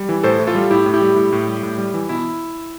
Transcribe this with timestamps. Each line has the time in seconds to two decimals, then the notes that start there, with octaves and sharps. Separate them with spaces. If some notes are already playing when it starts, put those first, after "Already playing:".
Already playing: G3
0.09 E3
0.23 A2 A4 C5
0.39 A2
0.47 F4 A4
0.55 G3
0.70 A2 E4 G4
0.86 A2
0.94 E4 G4
1.01 G3
1.16 A2
1.32 A2
1.47 G3
1.63 A2
1.78 G3
1.94 E3
2.09 B2 E4